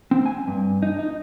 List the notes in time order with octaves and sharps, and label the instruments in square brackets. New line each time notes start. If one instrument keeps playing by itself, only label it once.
[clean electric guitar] C4
G#5
G2
D#4
D#4